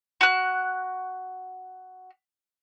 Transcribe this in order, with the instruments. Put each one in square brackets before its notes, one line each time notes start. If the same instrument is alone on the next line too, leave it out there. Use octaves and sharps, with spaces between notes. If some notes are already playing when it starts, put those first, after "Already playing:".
[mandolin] F#4 F#6